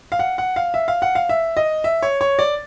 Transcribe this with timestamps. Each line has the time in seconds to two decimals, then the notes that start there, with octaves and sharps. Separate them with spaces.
0.12 F5
0.19 F#5
0.38 F#5
0.56 F5
0.74 E5
0.88 F5
1.02 F#5
1.15 F5
1.29 E5
1.57 D#5
1.84 E5
2.03 C#5
2.21 C#5
2.39 D5